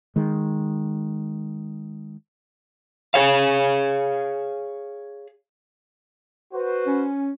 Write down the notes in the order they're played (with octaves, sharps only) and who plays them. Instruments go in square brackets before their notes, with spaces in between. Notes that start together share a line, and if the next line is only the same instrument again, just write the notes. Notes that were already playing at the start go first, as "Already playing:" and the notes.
[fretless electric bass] D#3 G#3
[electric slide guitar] G#4 C#5 F5
[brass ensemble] F#4 B4 C5
[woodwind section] C#4